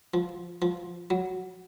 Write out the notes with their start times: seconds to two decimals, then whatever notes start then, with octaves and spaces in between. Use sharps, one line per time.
0.14 F3
0.62 F3
1.10 F#3